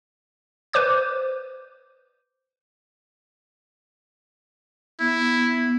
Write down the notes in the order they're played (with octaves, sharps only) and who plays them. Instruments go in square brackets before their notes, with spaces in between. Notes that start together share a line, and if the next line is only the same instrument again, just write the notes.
[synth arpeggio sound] B4 C5 D6 G6
[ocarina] B3 [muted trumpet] E4